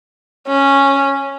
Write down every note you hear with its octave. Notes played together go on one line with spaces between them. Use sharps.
C#4